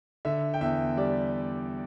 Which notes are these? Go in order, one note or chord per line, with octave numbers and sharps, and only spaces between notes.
D3 E5
G5
E2 E5
G3 D5